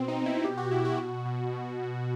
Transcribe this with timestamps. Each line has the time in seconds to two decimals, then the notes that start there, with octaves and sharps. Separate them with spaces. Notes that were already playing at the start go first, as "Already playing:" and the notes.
Already playing: B2 C4
0.08 D#4
0.17 B2
0.26 E4
0.45 B2 G4
0.58 F#4
0.71 B2 E4
0.85 F#4
0.99 B2 F#4
1.26 B2
1.52 B2
1.80 B2